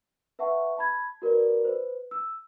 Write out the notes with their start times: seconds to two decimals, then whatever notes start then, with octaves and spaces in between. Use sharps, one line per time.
0.39 B4 E5 F#5 A5 C#6
0.77 A5 B5 G#6
1.22 F#4 A#4 B4 D5
1.64 B4 C5
2.11 E6